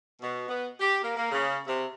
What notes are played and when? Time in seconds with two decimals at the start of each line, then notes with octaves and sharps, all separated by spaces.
0.21 B2
0.48 B3
0.80 G4
1.04 A#3
1.16 A#3
1.31 C#3
1.66 C3